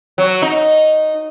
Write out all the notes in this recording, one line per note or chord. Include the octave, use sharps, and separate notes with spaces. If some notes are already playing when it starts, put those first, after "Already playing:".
F#3
D#4